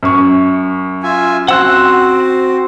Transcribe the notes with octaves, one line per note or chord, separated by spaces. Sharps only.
F#2 C#6
F4 E5 G#5
C4 F#4 C5 F#5 E6 F#6